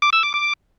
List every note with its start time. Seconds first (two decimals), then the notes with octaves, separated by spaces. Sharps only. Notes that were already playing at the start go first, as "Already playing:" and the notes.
0.02 D6
0.13 E6
0.23 D6
0.34 D6